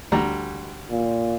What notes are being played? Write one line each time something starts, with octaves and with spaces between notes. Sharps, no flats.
D2 G3 A#5
A#2